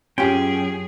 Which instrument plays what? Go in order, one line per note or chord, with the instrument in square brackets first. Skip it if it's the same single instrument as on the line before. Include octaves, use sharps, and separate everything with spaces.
[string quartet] F#2 G#4 [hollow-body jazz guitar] C#4 [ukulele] F4 G4 [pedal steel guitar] G5